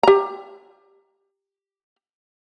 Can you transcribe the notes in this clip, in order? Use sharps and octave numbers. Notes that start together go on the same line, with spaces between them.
G4 A#5